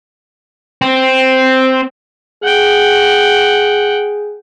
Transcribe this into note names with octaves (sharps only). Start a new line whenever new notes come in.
C4
G#4 F#5 G5